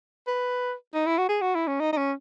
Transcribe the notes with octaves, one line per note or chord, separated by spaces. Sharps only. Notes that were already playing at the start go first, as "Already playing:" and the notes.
B4
D#4
E4
F#4
G#4
F#4
E4
C#4
D#4
D#4
C#4